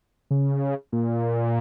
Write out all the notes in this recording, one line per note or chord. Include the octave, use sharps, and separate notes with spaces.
C#3
A#2